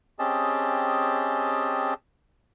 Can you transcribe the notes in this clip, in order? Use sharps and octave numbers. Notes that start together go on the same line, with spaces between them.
C4 C#4 G4 G#4 D#5 A5